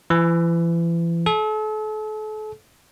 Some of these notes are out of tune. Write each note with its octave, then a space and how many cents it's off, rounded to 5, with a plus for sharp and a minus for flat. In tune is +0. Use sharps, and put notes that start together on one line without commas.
E3 +35
A4 -40